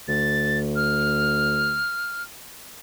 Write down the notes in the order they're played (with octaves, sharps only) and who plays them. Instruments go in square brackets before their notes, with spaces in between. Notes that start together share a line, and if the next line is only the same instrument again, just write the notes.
[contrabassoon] D2 [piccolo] A6
[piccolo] F6